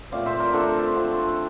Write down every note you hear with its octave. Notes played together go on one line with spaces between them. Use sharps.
A#2 F3 A3 C4 D5 F5
C5 E5
A#4 D5
D3 F3 A3 D4 A4 C5
D3 F3 C4